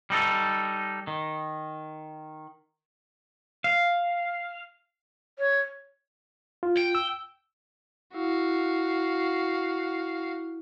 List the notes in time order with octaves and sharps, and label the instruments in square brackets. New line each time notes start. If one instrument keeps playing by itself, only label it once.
[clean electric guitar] G3 D#4 A4
D#3
[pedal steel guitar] F5
[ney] C#5
[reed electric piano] F4
[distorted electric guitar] G5
[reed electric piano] E6
[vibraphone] E4 [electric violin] F#4 F5